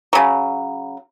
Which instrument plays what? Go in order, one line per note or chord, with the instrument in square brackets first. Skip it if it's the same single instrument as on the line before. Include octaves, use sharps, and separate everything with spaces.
[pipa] C#3 F#3